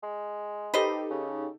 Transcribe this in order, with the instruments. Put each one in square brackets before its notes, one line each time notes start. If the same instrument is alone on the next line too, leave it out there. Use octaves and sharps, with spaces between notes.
[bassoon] G#3
[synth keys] D#4 G4 A4 [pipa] B4 C5 D#5
[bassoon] C#3